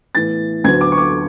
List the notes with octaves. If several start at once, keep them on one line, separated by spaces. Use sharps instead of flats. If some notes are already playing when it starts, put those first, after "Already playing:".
A2 E3 B3 A6
D2 D3 F#3 B3 G#6
D6
C#6
D6